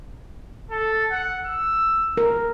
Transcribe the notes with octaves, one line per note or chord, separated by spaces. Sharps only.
A4
F#5
E6
A#4